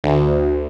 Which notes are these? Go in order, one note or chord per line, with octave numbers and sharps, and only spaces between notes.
D2